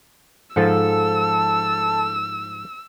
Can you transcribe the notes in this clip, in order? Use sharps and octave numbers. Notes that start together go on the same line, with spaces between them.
G#2 F3 A4 E6